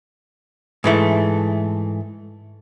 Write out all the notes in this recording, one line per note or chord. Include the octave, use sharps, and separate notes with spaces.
G#2 E3 A3